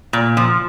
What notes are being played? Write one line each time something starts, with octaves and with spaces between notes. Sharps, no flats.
A#2
F3